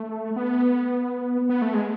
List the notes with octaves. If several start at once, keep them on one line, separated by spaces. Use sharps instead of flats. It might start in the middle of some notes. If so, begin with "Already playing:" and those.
Already playing: A3
B3
B3
A3
G#3